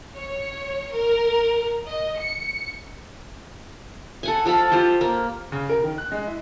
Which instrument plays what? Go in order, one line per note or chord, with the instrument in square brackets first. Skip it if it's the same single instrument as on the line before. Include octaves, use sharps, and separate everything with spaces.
[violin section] C#5
A#4
D#5
C#7
[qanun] A4 F#5 G#5
F3 A4 F5 B5
F4 G4 C5
A#3
[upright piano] C#3
A#4
D#3
F#6
G#3
E4